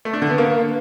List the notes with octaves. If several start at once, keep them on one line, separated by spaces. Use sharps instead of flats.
A3
D4
D3
B3
A#3